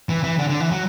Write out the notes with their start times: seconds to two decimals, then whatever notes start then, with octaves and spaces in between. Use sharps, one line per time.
0.09 E3
0.24 E3
0.38 D3
0.49 D3
0.60 E3
0.71 F#3